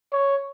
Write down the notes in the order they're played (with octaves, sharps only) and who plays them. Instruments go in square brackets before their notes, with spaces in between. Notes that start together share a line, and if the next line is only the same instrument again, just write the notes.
[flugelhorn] C#5